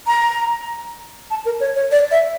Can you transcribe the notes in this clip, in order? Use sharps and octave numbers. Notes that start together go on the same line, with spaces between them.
A#5
A5
A#4
C#5
C#5
D5
E5